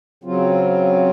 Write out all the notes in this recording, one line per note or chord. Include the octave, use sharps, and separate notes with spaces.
C#3 F#3 C4 F4